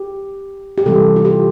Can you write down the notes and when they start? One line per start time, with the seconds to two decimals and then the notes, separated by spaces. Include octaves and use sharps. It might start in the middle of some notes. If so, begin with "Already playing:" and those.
Already playing: G4
0.78 G4
0.86 C3 E3 G3 A4
1.16 F4
1.25 G4